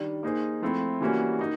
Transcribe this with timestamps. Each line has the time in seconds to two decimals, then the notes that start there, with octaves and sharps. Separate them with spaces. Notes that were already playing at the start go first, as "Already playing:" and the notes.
Already playing: D#3 G3 D4
0.23 A#3 D#4 G#4 C5
0.62 F3 A3 C4 E4
1.01 E3 G3 A#3 C#4 F#4
1.39 A#3 D#4